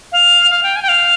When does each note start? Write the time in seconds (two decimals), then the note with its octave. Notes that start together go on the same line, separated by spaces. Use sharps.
0.12 F5
0.51 F5
0.63 G5
0.76 G#5
0.82 G5
0.88 F5